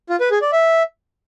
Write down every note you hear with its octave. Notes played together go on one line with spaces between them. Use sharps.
F4
B4
G#4
D5
E5